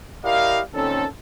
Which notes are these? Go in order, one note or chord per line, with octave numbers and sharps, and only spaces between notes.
E4 G4 A#4 D5 D#5 F5
A#2 D#3 C4 C#4 A4